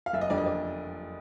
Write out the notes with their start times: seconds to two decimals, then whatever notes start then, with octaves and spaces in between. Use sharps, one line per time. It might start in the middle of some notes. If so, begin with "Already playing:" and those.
0.06 F5
0.13 F#1 E5
0.21 D#5
0.30 F2 D3 G3 D5
0.38 D#5
0.46 D5